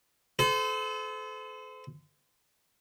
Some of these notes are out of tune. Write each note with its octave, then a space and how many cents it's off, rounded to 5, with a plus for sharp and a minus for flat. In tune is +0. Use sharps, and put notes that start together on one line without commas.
A4 -35 C5 -35